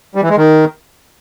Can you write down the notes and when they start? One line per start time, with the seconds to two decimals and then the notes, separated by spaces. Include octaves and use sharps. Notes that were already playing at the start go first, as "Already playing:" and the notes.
0.15 G3
0.22 E3
0.30 G#3
0.37 D#3